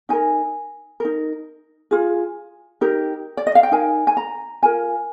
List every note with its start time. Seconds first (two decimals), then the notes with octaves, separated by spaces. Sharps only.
0.09 D#4 A#4 G#5
1.00 D#4 A#4
1.91 F4 G#4
2.81 D#4 G4 A#4
3.37 D5
3.47 D#5
3.55 F5
3.63 G5
3.71 D#4 A#4 G#5
4.07 G#5
4.17 A#5
4.63 F4 A#4 G#5